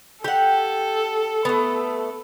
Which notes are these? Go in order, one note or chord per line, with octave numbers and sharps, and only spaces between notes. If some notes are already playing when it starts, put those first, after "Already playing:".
G4 A4 F#5
A3 B3